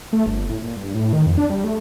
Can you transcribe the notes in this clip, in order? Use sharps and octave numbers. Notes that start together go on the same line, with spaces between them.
A3
G1
A2
A#2
G2
A2
D#3
F2
D4
G3
A3